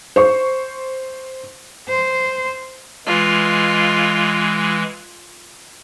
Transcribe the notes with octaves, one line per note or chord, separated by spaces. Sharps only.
C5 C#6
C5
E3 G#3 F4